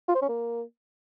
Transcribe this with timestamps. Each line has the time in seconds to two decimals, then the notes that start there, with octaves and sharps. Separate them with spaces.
0.08 F4
0.15 C5
0.22 C#4
0.28 A#3